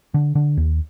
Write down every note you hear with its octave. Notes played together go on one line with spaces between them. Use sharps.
D3
D3
D#2